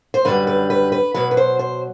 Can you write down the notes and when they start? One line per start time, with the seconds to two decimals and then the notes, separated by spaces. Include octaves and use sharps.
0.14 C5
0.25 F#2 D3 G3 B4
0.47 B4
0.70 B4
0.92 B4
1.14 B2 F#3 B4
1.31 B4
1.37 C5
1.59 C5